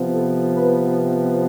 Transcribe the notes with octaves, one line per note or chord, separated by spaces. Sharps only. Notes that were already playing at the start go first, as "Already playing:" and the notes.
Already playing: C3 F3 B3
A4
B4